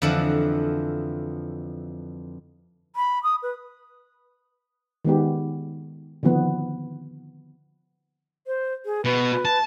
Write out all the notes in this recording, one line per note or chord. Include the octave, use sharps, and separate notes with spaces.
F2 D3 E3 F3 F#5
B5
D#6
B4
D#3 G#3 B3 G4
D3 D#3 F3 B3 C4
C5
G#4
B2 B4
A5